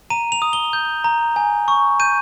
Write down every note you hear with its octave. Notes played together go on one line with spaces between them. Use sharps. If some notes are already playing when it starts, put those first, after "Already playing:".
A#5 D#7
F7
D#6
G7
G6
A#5
G#5
C#6
G6 D#7